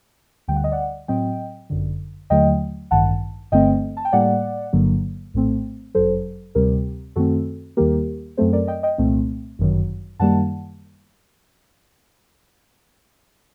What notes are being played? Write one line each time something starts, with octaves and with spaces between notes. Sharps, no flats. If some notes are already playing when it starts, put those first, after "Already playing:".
D2 D3 G3 G5
F#5
D#5
D5 F#5
A2 F#3 C4 D#5 G5
G1 F#2 D3
D#2 D3 F#3 A3 D#5 G5
A1 G2 D#3 F#5 A5
G1 G2 D3 A3 C4 D#5 G5
A5
G5
A2 G3 A#3 D5 F#5
G1 G2 D3 F#3 A#3
A#1 A2 A3 C4
G1 F#2 F#3 A4 C5
D2 C3 G3 C4 G4 A#4
F#2 D#3 A3 C4 F#4 A4
D#2 D#3 G3 A#3 G4 A#4
F#2 F#3 A3 C4 A4 C5
A#4 D5
D#5 G5
D#5 G5
C2 A#2 A3 C4
G1 F#2 D#3 F#3
F#2 D#3 G3 A#3 F#5 A5